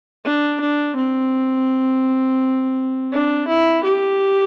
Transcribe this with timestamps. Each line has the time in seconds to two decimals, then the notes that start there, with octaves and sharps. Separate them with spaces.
0.25 D4
0.60 D4
0.96 C4
3.12 D4
3.47 E4
3.84 G4